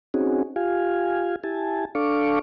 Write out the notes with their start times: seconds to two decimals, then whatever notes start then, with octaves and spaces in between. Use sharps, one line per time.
0.14 C4 C#4 D#4 F#4 G#4
0.56 F4 G4 F5 G#5
1.44 E4 G4 G#5 A5
1.95 D4 A4 F5 C#6 D6